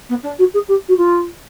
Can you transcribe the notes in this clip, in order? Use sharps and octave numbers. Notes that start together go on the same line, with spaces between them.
B3
D4
F#4
G#4
G4
F#4
F4